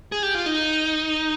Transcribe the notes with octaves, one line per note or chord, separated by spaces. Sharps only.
G#4
G4
F4
D#4